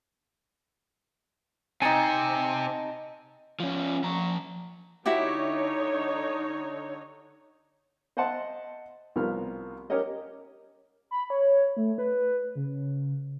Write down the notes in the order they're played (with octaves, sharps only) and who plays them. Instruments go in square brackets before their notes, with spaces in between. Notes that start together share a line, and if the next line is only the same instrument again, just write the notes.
[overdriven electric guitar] C3 C4 [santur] D#4 A5 [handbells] G#5 C#7
[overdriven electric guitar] F3 C#4
F3 A#5
[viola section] D3 D#4 C#5 [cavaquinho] E4 F#4 G4
[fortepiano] C5 D#5 E5 F#5 A5 C6
C2 F3 B3 A#4 F6
C#4 G4 A#4 C#5 D#5
[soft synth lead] B5
C#5
A3
B4
C#3